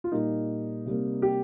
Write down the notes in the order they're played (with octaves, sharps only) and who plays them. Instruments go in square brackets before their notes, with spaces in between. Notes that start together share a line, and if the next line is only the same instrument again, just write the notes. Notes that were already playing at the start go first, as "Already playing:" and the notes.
[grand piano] F4
A#2 G3 A#3 D#4
C3 G3 A#3
G4